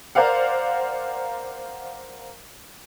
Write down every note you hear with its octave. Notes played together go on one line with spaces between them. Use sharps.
A#4 C5 D5 F5 F#5